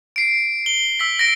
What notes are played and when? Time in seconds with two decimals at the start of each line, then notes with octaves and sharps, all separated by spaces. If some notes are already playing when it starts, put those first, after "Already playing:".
0.16 C7 D7
0.66 G7
1.00 E6 B6
1.19 A#6 D7